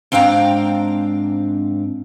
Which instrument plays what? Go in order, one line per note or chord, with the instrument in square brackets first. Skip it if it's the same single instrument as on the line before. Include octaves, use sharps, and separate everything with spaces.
[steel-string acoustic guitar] G#2 C4 D4 F5 G5 A#5